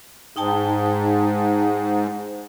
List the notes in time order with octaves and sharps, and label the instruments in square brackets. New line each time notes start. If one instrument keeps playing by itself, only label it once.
[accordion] G#2 [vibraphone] D#4 G5 A5